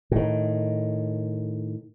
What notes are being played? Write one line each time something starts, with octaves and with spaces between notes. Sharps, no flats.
A2 D#3